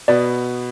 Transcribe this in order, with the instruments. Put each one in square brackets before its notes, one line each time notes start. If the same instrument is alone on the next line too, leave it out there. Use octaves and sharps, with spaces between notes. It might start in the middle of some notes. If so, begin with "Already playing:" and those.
[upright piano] B2 B3 [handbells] D5